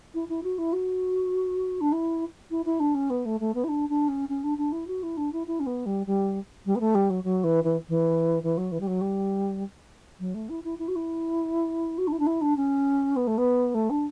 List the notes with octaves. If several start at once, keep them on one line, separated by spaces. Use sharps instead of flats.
E4
E4
F#4
E4
F#4
D4
E4
E4
E4
D4
C#4
B3
A3
A3
B3
E4
D4
D4
C#4
C#4
D4
D4
E4
F#4
E4
D4
E4
E4
C#4
B3
G3
G3
G3
B3
A3
G3
F#3
F#3
E3
E3
E3
E3
F#3
E3
G3
F#3
G3
F#3
A3
E4
E4
E4
F#4
E4
F#4
D4
E4
D4
E4
D4
C#4
B3
A3
B3
A3
D4